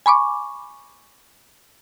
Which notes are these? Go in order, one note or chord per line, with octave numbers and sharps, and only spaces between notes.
G#5 B5 C#6 D6